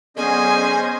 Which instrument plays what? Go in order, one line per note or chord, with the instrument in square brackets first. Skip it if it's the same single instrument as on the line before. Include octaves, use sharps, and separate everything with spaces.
[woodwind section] D3 F#3 B3 [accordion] C#4 C5 D#5 [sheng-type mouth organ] G#4 [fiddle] G#5